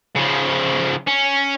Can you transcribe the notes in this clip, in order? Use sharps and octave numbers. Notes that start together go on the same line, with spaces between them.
C#3 F3
C#4